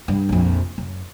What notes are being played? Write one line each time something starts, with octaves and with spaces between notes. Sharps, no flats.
G2
A#1 F2
F#2